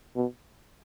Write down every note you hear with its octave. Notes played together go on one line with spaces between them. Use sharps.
B2